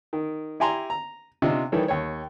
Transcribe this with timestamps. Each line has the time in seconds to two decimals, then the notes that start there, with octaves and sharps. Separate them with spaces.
0.13 D#3
0.60 E4 G4 G#5 A#5 C6
0.90 A#5
1.42 C3 D4 D#4 F4
1.72 D#3 E3 G3 A4 C#5
1.88 D#2 C#5